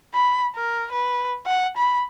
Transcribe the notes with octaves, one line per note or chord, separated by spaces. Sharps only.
B5
A#4
B4
F#5
B5